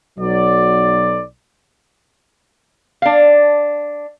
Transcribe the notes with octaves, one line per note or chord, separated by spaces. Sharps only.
B1 F#3 D5
D4 F5